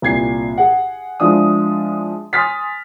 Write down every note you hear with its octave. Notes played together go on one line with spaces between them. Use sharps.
C2 A#2 G#6 C7
G#4 F#5
F3 G#3 D4 E4 D#6
G#5 C6 D#6 F6 A6 B6